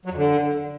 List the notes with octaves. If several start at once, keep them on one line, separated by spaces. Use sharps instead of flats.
F#3
F2
D3